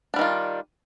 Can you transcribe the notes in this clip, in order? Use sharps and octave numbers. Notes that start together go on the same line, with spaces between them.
D#3 G3 D4 F4